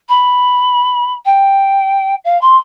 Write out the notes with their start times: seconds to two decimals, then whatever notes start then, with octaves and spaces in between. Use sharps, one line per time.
0.09 B5
1.25 G5
2.24 F5
2.41 C6